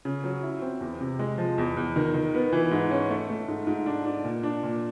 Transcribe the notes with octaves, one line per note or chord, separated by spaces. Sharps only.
C#3
F#3
E4
C4
E2
C3
G#3
F3
E2
E2
D#3
D#3
B3
E3
G#2
C#4
A3
A3
G#2
G#2
D4
D4
A#2
D4
A#2